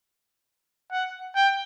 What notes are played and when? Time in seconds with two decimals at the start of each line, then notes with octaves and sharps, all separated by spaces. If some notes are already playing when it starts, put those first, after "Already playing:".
0.92 F#5
1.35 G5